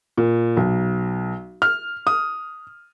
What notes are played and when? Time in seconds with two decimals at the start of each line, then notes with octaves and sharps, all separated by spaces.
0.17 A#2
0.57 B1
1.62 F6
2.07 D#6